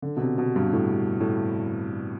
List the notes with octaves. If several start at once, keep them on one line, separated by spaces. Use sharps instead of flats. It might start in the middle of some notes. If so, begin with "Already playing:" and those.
D3
B2
C3
B2
G2
A2
A2